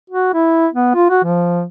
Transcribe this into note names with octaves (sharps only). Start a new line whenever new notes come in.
F#4
E4
B3
F4
F#4
F3